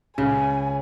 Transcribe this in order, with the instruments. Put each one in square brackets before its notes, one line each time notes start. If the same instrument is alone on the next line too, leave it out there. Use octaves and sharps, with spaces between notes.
[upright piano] C#2 [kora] C#3 [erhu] G#5